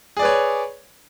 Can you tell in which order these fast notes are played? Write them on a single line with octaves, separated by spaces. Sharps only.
G#4 D5 B4 C#5